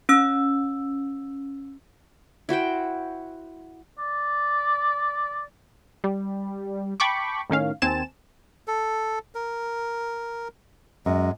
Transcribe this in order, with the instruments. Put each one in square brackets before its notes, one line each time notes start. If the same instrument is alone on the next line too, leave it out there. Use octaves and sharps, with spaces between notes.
[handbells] C#4 E6
[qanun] E4 F#4 C5 G5
[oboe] D5
[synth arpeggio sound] G3
G5 A5 B5 C#6 D6
A2 D#3 C#4 F5
D#2 C4 G#5 A5 E7
[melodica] A4
A#4
[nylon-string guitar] F#2 [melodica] G#3